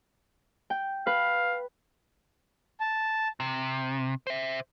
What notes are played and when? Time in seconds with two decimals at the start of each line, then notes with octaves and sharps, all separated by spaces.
0.70 G5
1.07 B4 F5
2.80 A5
3.40 C3
4.27 C5 E5